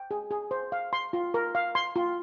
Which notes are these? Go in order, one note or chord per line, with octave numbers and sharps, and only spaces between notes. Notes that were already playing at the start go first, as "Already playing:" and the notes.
Already playing: G5
G#4
G#4
C5
F5
C6
F4
A#4
F5
C6
F4